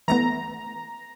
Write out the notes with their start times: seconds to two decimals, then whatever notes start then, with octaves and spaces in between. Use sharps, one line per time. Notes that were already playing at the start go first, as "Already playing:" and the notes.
0.08 E3 A3 B3 A#5